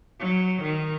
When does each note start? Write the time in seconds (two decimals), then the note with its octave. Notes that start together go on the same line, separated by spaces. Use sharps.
0.20 F#3
0.62 D#3